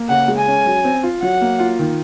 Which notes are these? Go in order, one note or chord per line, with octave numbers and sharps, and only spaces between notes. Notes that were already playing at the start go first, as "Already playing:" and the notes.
Already playing: A#3
C#3 F#5
G#3
G#5
C#4
F#3
C4
F4
F#3 F#5
A#3
F4
D#3